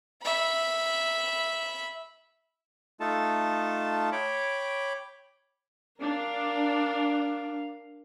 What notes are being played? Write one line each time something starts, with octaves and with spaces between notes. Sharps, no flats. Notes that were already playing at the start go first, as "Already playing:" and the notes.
E5 B5
A3 D#4 F4 A4 A5
C#5 G5 B5 D6
D4 A#4 F5